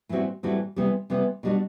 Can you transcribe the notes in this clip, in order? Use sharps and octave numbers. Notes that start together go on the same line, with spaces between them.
A2 E3 G3 C4 F#4
A2 E3 G3 C4 F#4
C3 E3 G3 B3
C3 E3 G3 B3
B2 G3 D4 F#4